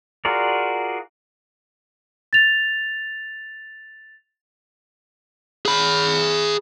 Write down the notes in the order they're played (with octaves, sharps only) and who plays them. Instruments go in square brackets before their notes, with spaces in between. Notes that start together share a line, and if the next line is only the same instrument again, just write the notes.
[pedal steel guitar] F4 F#4 G#4 A#4 D5
[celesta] A6 F7
[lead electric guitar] G#4 B5